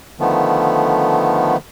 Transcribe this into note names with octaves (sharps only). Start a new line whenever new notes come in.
D3 D#3 F3 A3 B3